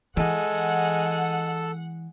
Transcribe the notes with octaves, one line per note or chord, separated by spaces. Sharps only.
E3 G#3 A4 F#5